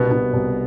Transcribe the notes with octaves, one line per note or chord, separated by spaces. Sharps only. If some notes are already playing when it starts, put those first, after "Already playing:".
Already playing: C2 B2 B3
B2
C2